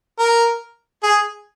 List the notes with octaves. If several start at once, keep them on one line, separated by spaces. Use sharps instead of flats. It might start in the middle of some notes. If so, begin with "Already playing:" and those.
A#4
G#4